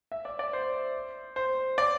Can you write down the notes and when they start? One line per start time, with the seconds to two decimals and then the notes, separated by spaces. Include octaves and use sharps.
0.12 E5
0.25 D5
0.39 D5
0.53 C5
1.36 C5
1.78 D5